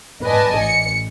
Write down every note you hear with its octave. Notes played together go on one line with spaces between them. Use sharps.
B4 D5 D#5 G#5 A5
A1 C#7